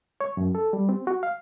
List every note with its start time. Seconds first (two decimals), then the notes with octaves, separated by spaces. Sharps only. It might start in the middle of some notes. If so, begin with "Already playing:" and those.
0.21 C#5
0.37 F#2
0.55 A4
0.73 G3
0.89 C4
1.07 F#4
1.23 F5